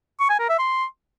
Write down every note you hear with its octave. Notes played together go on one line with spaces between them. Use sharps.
C#6
G#5
A#4
E5
C6